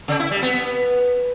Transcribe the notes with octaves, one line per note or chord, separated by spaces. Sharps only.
C#3
E4
G3
B3
B3